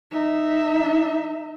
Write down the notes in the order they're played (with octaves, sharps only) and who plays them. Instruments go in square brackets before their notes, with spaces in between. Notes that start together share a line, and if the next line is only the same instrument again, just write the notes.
[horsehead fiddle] D#4 E5